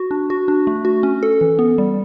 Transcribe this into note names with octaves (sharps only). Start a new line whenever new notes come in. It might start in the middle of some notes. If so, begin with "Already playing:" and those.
Already playing: F#4
D4
F#4
D4
A3
F#4
C#4
A4
E3
B3
G3